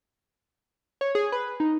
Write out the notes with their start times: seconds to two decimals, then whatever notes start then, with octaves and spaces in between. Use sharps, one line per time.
1.01 C#5
1.15 G#4
1.32 B4
1.60 D#4